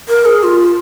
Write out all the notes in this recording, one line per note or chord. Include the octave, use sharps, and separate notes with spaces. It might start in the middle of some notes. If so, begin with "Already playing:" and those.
A#4
G#4
F4